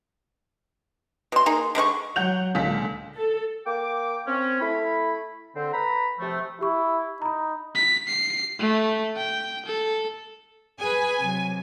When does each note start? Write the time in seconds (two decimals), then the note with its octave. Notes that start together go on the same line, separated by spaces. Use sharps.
1.32 B2 C6
1.46 A#3 D#4 G#4
1.75 D3 G#3 B4 C#6
2.16 F#3 F#5 G6 F7
2.55 C#2 A#2 D3 G#3 B6
3.15 A4
3.66 A#3 G5 D6
4.26 C4 C#4
4.60 A3 E4 B5
5.55 D3 C4
5.72 B4 A#5 B5
6.19 C3 F3 A3
6.61 E4 G4 C#6
7.22 D#4 A#5 B5
7.75 B6
8.08 C7
8.59 A3
9.17 G5
9.66 A4
10.80 G#4 B4 G#5
11.19 C3 F#3